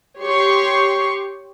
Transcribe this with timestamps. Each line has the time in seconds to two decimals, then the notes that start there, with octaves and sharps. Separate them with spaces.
0.21 G4 C#5 C6 C#6